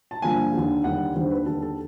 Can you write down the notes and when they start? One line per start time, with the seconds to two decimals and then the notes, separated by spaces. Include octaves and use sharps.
0.11 A5
0.22 G2 D3 F3 A#3 G#5
0.53 D#2 D3 G3
0.84 D#2 D3 G3 F#5
1.15 D#2 D3 G3 C5
1.31 B4
1.46 D#2 D3 G3 A4
1.62 A4